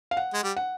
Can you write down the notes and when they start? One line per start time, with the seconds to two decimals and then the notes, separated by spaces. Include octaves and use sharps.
0.11 F5
0.17 F#5
0.34 G#3
0.44 G3
0.57 F#5